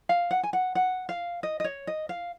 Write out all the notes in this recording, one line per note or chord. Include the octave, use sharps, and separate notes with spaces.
F5
F#5
G#5
F#5
F#5
F5
D#5
D#5
C#5
D#5
F5